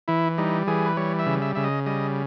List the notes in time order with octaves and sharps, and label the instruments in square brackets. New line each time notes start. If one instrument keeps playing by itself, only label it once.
[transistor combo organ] E3 E4
G3 D#4
E3 G#4
B4
G3 C#5
E5
C#3
E5
C#3 E5
D#5
G3 D#5